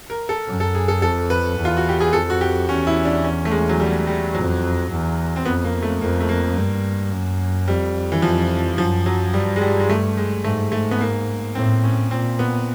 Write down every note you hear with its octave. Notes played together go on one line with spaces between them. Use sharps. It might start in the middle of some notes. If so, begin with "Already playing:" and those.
A#4
A4
F#2
A4
G#4
A4
F2 A4
B4
E2
F4
F#4
G4
G#4
F2 A4
F#4
G4
E2 C#4
E4
D4
C#4
A3
G#3
F#3
G3
G3
F2 F#3
E2
C4
F2 B3
A#3
A3
F2 A#3
A3
A#3
G2
F#2
F2 G3
E3
F2 F3
F#2 F3
F#3
G2 G3
G#3
G3
G#3
A3
G#3
G#2 A3
A3
B3
A#3
A2 C4
C#4
A#2 C4
B3